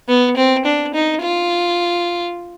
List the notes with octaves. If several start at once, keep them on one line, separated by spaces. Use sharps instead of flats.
B3
C4
D4
D#4
F4